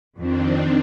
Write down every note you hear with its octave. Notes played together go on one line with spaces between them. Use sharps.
F2 D#3 C4 D4